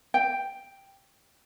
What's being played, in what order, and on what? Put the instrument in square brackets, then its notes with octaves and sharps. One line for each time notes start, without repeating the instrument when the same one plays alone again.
[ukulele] G5